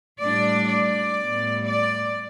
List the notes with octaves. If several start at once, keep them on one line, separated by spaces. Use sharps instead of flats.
A2 G3 D4 D5
D5
A2 G3 B3
D5